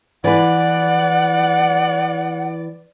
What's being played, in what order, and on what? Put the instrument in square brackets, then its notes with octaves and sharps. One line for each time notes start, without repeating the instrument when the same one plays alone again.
[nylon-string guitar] E3 B4 [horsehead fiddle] D5 [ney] F#5